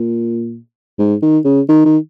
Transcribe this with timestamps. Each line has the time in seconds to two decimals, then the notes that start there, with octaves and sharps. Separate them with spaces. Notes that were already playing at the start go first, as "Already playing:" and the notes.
Already playing: A#2
0.99 G#2
1.22 D#3
1.45 C#3
1.69 D#3
1.85 D#3